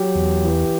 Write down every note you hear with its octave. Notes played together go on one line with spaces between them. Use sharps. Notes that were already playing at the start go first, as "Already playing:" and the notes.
Already playing: F#3 G4
E2
E3